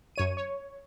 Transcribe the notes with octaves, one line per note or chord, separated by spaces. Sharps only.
F#2 C#5 D#7
C#5